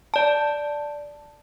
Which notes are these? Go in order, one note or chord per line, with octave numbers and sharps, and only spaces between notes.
D5 A5